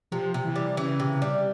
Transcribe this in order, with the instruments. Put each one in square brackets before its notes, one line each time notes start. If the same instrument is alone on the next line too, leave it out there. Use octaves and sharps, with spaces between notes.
[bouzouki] C3 [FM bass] F3
[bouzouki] C3
[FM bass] E3
[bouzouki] G3
[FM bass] C#3 [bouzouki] E3
[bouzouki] C3
G3